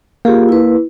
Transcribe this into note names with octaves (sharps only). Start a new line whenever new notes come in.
A#3 F4 G4 G#4
E4 B4